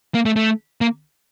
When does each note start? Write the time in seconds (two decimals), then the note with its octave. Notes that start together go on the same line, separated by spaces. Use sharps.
0.15 A#3
0.26 A3
0.36 A3
0.81 A#3